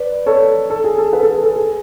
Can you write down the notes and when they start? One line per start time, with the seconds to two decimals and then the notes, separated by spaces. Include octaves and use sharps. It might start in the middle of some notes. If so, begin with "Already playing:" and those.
Already playing: B4 D5
0.26 A4 C#5
0.70 A4
0.84 G#4
0.98 A4
1.13 B4
1.23 A4
1.33 G#4
1.43 A4
1.56 G#4